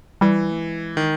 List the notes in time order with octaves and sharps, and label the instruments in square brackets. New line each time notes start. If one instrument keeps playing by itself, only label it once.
[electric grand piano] E3 [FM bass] G3
[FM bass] A3
G#3
[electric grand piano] D#3